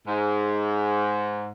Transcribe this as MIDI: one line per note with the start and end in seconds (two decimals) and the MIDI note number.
0.07 1.48 44